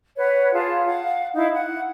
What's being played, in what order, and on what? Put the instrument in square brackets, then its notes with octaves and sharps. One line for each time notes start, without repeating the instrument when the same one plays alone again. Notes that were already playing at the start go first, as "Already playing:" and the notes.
[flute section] B4 C#5 F#5
F4 G#4 A5
F5 F#5
D#4 E4 F5
F#5